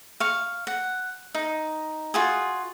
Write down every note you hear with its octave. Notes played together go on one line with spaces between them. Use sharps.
F5 C#6
F#5
D#4
F4 F#4 G#4